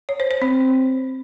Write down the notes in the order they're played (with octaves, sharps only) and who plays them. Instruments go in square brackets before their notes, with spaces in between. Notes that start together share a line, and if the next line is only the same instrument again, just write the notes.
[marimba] C#5
C5
C5
C4